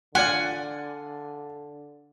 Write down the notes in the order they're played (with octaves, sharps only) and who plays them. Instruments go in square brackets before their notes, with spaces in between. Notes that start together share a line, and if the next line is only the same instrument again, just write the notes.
[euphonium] D3 [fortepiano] F4 D5 [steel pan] F#5 [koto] G#5